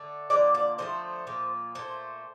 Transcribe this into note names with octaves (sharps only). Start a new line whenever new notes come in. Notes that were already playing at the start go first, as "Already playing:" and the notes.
Already playing: D3 A3
D3 F3 A#3 D5
D5
D3 F3 A3 C5
A#2 F3 A#3
A#2 A3 C5